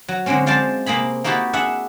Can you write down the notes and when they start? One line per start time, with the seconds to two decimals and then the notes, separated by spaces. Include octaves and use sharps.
0.08 F#3
0.26 D3 F#3 G#3 C4 C#4
0.46 G#3 F4 C5 D5 A5
0.86 C3 A#3 C4 G#4 B5
1.24 A#3 D#4 E4 F#4 G4 A4
1.53 D4 G#4 E5 F#5